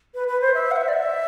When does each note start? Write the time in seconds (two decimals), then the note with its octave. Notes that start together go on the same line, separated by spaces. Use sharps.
0.15 B4
0.28 B4
0.41 C5
0.54 E5
0.71 F#5
0.76 E5
0.88 D5
0.93 E5